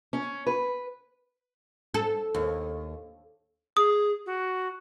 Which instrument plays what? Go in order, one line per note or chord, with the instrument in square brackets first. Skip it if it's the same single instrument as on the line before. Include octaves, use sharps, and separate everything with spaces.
[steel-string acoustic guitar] C#4
B4
[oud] A4
D#2
[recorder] G#4 [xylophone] D#6
[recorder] F#4